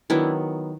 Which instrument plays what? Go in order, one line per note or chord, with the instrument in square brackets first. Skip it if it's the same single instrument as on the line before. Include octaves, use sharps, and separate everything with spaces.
[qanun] D#3 F#3 B3 D4 E4